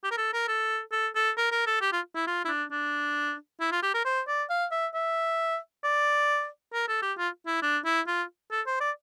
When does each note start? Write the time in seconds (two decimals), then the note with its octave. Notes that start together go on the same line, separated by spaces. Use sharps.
0.04 G4
0.11 A#4
0.18 A4
0.33 A#4
0.48 A4
0.92 A4
1.15 A4
1.37 A#4
1.52 A#4
1.67 A4
1.81 G4
1.93 F4
2.15 E4
2.27 F4
2.45 E4
2.48 D4
2.71 D4
3.60 E4
3.72 F4
3.83 G4
3.94 A#4
4.05 C5
4.28 D5
4.50 F5
4.71 E5
4.94 E5
5.84 D5
6.73 A#4
6.88 A4
7.02 G4
7.18 F4
7.47 E4
7.62 D4
7.85 E4
8.07 F4
8.51 A4
8.67 C5
8.81 D5